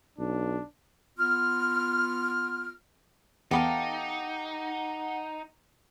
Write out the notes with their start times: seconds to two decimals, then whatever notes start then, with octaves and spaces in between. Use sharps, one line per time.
0.18 B1 D4
1.18 B3 F4 F6
3.51 E2 B3 D#4 G4 A4 F5 F#5